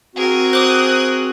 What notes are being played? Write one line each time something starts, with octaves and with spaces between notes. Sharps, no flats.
C4 F#4 G#4 A#4
C5 D6 D#6 F#6